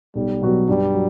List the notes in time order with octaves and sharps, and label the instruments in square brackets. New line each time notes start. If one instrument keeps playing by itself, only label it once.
[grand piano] B1 [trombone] G3
[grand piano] B2 F#3 B3 F#4
[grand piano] G2 [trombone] G3
[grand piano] F#3